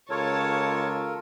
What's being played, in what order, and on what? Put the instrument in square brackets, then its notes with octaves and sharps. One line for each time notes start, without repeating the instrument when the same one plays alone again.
[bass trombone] C#2 [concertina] F4 A4 A#4 [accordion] C#5 [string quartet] A5 C#6